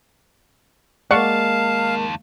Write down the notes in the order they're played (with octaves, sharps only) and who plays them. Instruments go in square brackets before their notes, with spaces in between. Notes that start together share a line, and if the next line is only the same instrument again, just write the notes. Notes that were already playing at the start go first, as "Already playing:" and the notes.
[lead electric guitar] D#2 A5 [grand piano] G#3 A#3 [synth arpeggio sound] D5 F#5 C#6 [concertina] F5